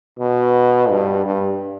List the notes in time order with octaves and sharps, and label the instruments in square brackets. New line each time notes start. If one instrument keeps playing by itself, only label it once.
[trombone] B2
G2
G2